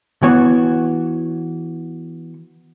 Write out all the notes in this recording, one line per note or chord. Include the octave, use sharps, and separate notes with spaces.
E3 B3 F#4 C#5